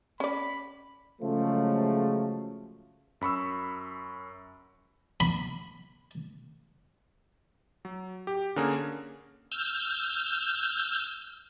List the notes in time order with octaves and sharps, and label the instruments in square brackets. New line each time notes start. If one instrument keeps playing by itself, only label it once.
[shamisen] C#4 D5 [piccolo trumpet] B5
[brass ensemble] C#3 F3 F#3 G#3 A3
[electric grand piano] F#2 B5 C#6 E6
[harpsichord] B5
[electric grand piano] F#3
G4
D3 A#3 C#4 G#4 A#4
[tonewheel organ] E6 F6 G6